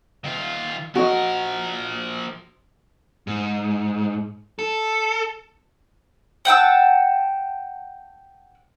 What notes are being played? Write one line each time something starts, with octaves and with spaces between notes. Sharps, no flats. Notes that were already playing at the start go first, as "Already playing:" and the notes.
D#3 F4
F3 F#4 A#4 D#5
G#2
A4
F#5 G5 A5 E6